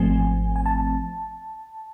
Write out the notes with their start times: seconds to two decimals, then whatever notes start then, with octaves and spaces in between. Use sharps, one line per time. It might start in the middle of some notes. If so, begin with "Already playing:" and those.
Already playing: G#1 G#2 F3 A3 C4 G#5
0.56 G#5
0.66 A5